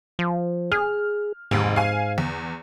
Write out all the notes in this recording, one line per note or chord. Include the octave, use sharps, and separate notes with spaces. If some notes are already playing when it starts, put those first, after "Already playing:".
F3
G#4 F6
F1 D#2 G#2
F5 G#5
E2